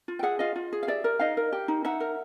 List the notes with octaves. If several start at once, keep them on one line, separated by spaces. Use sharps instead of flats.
F4
G5
G#4 E5 F#5
F4 D#5 F5
F4
G#4
F5
G4 D5 E5
A#4
D#4 D#5 F5
A#4
G4
D#4
D#4 E5 F#5
A#4